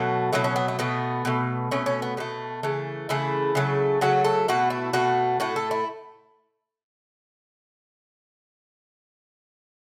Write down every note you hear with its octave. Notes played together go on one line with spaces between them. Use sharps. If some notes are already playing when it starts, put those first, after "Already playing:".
Already playing: B2 F#3 A3 F#4
B2 F#3 A3 E4
C#4
B3
A3
B2 A3 B3
B2 A3
B2 A3 C#4
C#4
B3
B2 A3 B3
C#3 E3 A3
C#3 E3 A3 E4
C#3 F#3 A3
C#3 F#3 A3 F#4
A4
B2 A3 F#4
E4
B2 A3 F#4
A2 A3 F#4
A4
E4